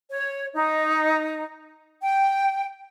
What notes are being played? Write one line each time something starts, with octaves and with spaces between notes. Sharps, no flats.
C#5
D#4
G5